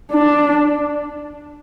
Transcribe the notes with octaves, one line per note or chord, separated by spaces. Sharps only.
D4